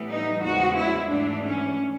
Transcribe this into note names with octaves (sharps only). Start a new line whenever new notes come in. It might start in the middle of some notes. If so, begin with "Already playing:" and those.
Already playing: A2 E3 G3 B3
D#4
E2 C#3 F3 G#3 F#4
E4
G#2 E3 A3 D4
C#4